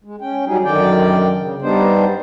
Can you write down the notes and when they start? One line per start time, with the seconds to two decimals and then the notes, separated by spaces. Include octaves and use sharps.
0.04 G#3
0.21 C#4 G5
0.46 F#3 G3 C#4 D#4 G#4
0.64 F#2 D3 D#3 D5 G5
1.39 C#3
1.62 G2 G3 B3 D4 D#4 C5